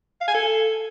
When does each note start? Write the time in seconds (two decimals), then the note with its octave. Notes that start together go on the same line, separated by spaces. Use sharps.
0.21 F5
0.28 G#5
0.35 A4